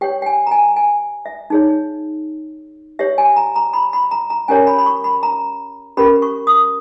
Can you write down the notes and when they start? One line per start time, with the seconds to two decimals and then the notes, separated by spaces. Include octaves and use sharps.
0.01 G4 C#5 G5
0.22 G5
0.26 G#5
0.47 A#5
0.51 G#5
0.76 G#5
1.26 E5
1.50 D#4 G#4 C#5
2.99 G4 C#5 E5
3.18 G#5
3.36 A#5
3.56 A#5
3.73 B5
3.93 B5
4.11 A#5
4.30 A#5
4.48 C#4 G4 A#4 C#5 G#5
4.67 B5
4.78 B5
4.86 C#6
5.04 B5
5.23 A#5
5.97 C#4 G4 A#4 B5
6.22 C#6
6.47 D#6